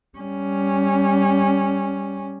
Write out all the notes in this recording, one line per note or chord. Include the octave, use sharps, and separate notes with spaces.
G3 C#4